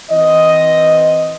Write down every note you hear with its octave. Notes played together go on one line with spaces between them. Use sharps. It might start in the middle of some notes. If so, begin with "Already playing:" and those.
E3 C4 D#5